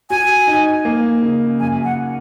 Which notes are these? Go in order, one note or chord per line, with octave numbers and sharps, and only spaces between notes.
F#4 G#5
D#4
A#3
C#3
F#2 G#5
F#5